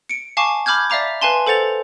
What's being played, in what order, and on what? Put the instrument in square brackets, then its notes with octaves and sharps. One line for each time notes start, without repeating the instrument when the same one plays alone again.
[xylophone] C#7 D7
F5 G#5 A5 C#6 D6
B5 D6 F6 G6 G#6
D5 E5 F5 A#5 D6
B4 F5 G#5 A5 C6
A4 C5 F#5 A6 F7